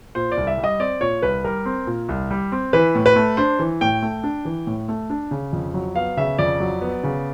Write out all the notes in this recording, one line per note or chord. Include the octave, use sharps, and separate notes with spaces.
A#2 C5
D5
C2
E5
G3
D#5
C4 D5
A#2 C#5
C2 B4
G3 A#4
C4
A#2
C2
G3
C4
E3 B4
A2
B4
A3
D4 C5
E3
A2 G5
A3
D4
E3
A2
A3
D4
C#3
F2
F#3
B3 F5
C#3 E5
F2 D5
F#3
B3
C#3